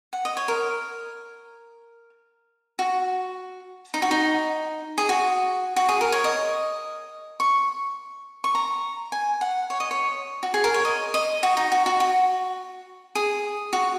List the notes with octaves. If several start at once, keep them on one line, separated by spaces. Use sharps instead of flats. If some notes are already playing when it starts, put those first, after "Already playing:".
F#5
D#5
C#5
A#4
F#4
D#4
F#4
D#4
G#4
F#4
F#4
G#4
A#4
C#5
D#5
C#6
C#6
A#5
G#5
F#5
C#5
D#5
C#5
F#4
G#4
A#4
C#5
D#5
D#5
F#4
D#4
F#4
F#4
F#4
G#4
F#4